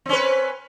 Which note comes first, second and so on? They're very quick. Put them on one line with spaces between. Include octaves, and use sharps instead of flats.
C4 C#4 B4